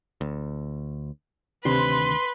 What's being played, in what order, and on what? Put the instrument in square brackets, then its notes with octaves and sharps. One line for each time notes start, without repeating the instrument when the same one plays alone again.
[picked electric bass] D2
[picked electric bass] D2 D#3 D4 [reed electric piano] C3 [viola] B4 [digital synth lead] C6